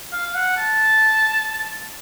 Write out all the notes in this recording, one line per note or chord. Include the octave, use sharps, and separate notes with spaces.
F5
F#5
A5